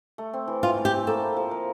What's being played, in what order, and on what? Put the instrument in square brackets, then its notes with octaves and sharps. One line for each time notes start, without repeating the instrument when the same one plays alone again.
[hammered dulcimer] A3
C4
E3
[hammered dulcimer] E3 [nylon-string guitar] F4
[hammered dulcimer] A3
[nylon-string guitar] G4
[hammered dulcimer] C4
[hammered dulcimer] A#3 [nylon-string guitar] A4
[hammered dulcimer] E4
F3
A#4